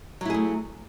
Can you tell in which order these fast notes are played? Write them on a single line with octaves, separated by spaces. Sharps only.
F#3 E4 G#4 A3